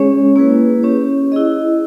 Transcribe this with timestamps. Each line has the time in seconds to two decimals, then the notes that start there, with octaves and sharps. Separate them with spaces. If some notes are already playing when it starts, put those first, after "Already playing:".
Already playing: G#3 C#4 G#4 C#5
0.36 A#3 E4 G#4 B4
0.83 C#4 G4 C#5
1.32 E4 G#4 D#5